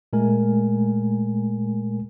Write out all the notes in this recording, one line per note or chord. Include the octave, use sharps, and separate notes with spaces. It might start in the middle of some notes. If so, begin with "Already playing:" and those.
A#2 G#3 A3 A#4 G#5